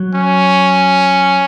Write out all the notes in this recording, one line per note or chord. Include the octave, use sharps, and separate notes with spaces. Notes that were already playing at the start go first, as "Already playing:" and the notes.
Already playing: F#3
C#4